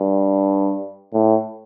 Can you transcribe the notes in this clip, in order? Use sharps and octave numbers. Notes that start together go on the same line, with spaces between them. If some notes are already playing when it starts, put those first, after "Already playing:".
Already playing: G2
A2